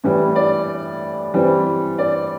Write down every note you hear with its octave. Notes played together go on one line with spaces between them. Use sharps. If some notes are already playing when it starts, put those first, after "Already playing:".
A2 E3 G3
D5
E3 G3 C4
D5